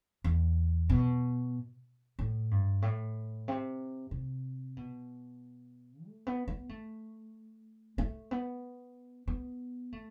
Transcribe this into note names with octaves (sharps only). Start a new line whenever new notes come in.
E2
B2
A2
G2
A2
C3
C3
B2
A3
B3
B3
A3
A3
B3
B3
A3